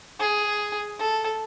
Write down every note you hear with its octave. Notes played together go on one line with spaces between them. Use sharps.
G#4
A4